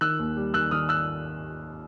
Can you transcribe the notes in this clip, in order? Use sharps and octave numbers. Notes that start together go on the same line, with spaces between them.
D#3 E6 F#6
D#2
G3
D#3 E6 F#6
D#3 D#6 F6
E6 F#6